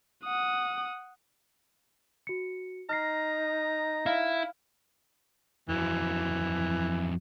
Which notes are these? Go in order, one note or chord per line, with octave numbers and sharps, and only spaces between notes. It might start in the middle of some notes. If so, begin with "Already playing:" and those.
F#5 D#6
F#4 C#7
D#4 A#5 F6 A#6 C7
E4 F5 F6
F2 E3 F#3